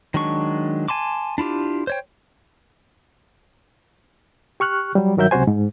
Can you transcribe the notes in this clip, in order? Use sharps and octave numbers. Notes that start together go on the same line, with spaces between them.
D#3 F#3 G#3 D4 C#6
G#5 A5 C6 D6
D4 E4 F4 G4
C5 C#5 G5
G4 C#6 F6 F#6
F#3 G3
G2 D#3 F#3 A#4 E5 G6
C#2 C3 F#3 F#4 C5 G#5
G#2